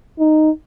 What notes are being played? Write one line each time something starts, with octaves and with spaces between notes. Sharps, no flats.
D#4